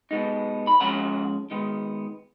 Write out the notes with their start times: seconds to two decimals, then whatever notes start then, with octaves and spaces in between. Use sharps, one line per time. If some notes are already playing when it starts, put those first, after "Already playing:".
0.11 B2 G#3 B3 D#4
0.67 B5
0.80 F3 G#3 C#4 F#5 A#5
1.51 D#3 G#3 B3 D#4